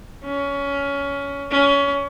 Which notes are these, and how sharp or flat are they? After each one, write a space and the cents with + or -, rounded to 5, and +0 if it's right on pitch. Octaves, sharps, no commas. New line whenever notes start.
C#4 +20
C#4 +25